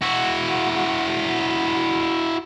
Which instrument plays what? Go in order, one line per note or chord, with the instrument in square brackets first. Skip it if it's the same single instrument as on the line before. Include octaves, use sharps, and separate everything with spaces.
[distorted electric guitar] E4 F#4